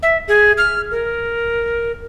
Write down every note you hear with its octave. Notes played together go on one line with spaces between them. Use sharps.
E5
G#4
F6
A#4